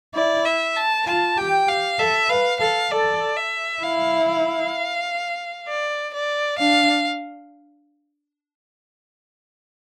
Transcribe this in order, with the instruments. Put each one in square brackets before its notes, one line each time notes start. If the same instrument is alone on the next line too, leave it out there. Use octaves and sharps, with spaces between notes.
[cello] E4 [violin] D5
[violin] E5
A5
[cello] F4 [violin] A5
[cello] G4 [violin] G5
[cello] G4 [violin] F5
[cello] A4 [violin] E5
[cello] B4 [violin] F5
[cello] A4 [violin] F5
[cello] A4 [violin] D5
[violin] E5
[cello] E4 [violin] F5
[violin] F5
D5
D5
[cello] D4 [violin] F5